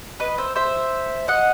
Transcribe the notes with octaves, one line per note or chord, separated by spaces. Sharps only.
B4 D#5
C5 E5
C5 E5
D#5 F#5